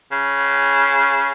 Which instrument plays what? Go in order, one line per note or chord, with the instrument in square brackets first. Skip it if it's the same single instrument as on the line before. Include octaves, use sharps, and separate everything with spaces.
[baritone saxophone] C#3